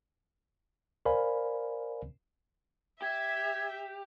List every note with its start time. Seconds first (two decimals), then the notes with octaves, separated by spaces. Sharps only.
1.05 A#4 C5 D5 F5 G#5 B5
3.02 G4 E5 G#6